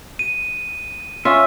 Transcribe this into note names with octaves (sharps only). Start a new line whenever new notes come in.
D#7
C#4 F4 C#5 E5